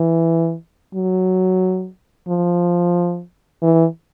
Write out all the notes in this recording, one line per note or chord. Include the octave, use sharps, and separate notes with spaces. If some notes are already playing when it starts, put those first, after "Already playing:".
Already playing: E3
F#3
F3
E3